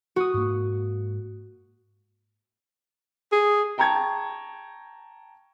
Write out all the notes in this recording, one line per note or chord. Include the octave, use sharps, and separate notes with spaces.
F#4 D#6
G#2 A#3
G#4
G5 A5 A#5 C#6 G#6